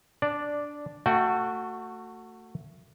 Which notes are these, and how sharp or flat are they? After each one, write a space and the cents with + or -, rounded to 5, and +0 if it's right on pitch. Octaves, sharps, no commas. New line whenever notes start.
D4 -5 D5 +0
A3 +25 F#4 -5 G5 +0